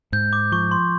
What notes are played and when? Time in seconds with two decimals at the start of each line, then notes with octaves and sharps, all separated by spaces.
0.12 G#2 G6
0.33 D6
0.52 F3 C#6
0.71 C6